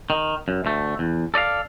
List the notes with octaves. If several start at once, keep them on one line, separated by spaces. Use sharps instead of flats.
D#3
F#2
D2 A3
E2
A4 D5 D#5 F5